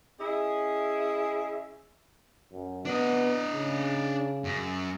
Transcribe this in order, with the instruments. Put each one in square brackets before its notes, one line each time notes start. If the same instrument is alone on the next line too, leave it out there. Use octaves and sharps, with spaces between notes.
[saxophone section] C#4 E4 G#4 D#5 E5
[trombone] F#2
[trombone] B3 [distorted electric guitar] D4 D#5
[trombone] C#3
[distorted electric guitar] F#2